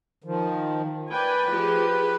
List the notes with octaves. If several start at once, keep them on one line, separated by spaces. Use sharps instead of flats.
D#3 F3
B4 D5 G5 G#5
F3 G4 G#4